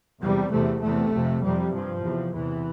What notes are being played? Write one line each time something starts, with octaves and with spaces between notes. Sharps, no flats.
E2 C3 G3
E2 C3 A3
E2 C3 A3
F2 C3
F2 C3 G3
G2 F3
E2 C3
E2 C3 E3